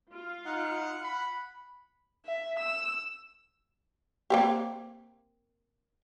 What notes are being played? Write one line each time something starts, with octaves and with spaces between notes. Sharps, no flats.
F4 F5
D#4 F#5
B5
E5
E6
A#3 C4 G4